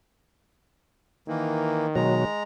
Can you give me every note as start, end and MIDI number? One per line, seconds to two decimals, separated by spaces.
1.28 2.26 51
1.28 1.87 52
1.28 1.87 58
1.95 2.25 47
1.95 2.25 54
1.95 2.43 56
1.95 2.43 82